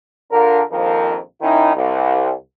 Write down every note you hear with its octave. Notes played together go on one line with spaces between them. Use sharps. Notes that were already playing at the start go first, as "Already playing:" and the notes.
D3 D4 F4 A#4
A#1 F2 D#3 F3 A#4
D#3 C#4 D#4 E4
C2